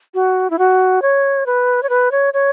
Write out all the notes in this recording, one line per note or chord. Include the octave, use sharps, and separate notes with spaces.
F#4
E4
F#4
C#5
B4
C#5
B4
C#5
C#5